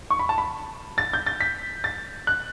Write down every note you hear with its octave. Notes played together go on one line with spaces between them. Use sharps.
C#6
B5
A5
B5
A6
G6
A6
B6
A6
F#6